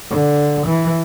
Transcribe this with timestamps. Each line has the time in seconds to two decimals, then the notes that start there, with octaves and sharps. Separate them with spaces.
0.11 D3
0.66 E3